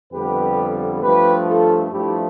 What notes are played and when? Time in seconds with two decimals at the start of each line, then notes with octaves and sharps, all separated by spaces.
0.12 F2 D3 G3 B3 G4 B4
1.02 G2 F3 A3 G4 B4
1.46 F4 A4
1.91 G2 F3 A3 E4 G4